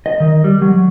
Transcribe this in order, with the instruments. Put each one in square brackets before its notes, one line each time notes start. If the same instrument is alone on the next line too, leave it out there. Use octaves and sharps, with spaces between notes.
[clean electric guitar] D#5
D#3
G3
F#3